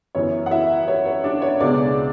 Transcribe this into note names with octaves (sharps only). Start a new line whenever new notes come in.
F#2 E3 B3 C#5
F#5
E4 E5
C#5
C#5
D4 D5
C#5
C#2 B2 G#3 B3 D4 D5